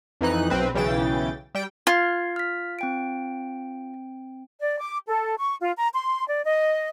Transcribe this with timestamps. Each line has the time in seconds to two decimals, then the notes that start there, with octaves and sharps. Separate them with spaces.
0.21 F2 E3 D#4 F#6
0.50 B1 C4 B4
0.74 B1 C#3 E3 G5 A6
1.55 G3 G5
1.87 F4 G#6 C7
2.36 F6 B6
2.79 C4 G5 D7
4.60 D5
4.79 D6
5.07 A4
5.38 C#6
5.60 F4
5.77 A#5
5.93 C6
6.27 D5
6.44 D#5